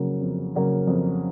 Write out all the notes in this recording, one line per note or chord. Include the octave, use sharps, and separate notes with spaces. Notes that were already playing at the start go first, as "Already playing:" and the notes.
Already playing: F2 C#3 F#3 A#3
F2
C#3 F#3 A#3
F2